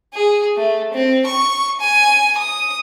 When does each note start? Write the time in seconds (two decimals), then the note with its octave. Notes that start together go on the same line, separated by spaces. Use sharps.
0.14 G#4
0.57 A3
0.93 C4
1.26 C#6
1.80 G#5
2.38 D#6